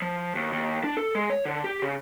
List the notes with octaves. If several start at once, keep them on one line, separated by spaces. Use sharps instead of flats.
F3
D#2
D#2
D4
A4
G#3
C#5
D3
G4
C#3